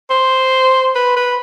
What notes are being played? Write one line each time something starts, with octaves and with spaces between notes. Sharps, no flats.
C5
B4
B4